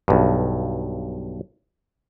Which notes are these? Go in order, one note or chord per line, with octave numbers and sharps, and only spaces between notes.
B1 G2